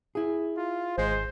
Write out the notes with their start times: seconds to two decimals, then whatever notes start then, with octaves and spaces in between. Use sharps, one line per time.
0.15 E4 G#4
0.57 F4
0.98 G#1 G#3 C5